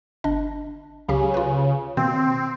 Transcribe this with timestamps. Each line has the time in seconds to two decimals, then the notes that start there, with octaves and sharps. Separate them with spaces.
0.24 G1 D4 D#5
1.08 C#2 C#3 F#3 G4
1.34 F4 B4
1.97 B2 D#3 A#3 C4